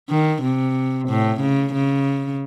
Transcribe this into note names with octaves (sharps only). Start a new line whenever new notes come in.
D#3
C3
A2
C#3
C#3